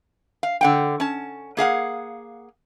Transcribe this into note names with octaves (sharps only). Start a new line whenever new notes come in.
F5
D3 F#5 G5
C#4 A5
A#3 G#4 F5 F#5